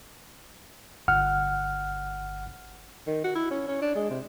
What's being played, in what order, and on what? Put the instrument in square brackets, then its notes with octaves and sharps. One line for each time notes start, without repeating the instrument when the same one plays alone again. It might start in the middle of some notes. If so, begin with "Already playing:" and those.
[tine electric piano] G1 F#5 F6
[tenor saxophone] D#3
F#4
E4
C#4
C#4
D4
G#3
C3